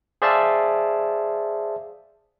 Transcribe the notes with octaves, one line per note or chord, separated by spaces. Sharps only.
G#4 C5 D5 E5 F5 A5